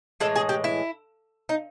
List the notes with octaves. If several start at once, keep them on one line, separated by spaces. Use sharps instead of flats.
A2 E3 G#3 A4
G#4
G4
E4
D#4